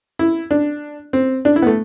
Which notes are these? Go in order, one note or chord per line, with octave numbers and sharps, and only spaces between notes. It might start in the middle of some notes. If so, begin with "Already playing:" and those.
E4
D4
C4
D4
E4
B3
A3